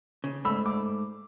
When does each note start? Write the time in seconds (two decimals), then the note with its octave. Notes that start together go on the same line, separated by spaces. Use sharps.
0.24 C#3
0.45 G#2 A3 B5 E6
0.66 D6